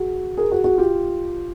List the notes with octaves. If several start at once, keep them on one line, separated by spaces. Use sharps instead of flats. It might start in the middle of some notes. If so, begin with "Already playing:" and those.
Already playing: F#4 G#4
G#4 A#4
F#4 G#4
F#4 G#4
F4 G4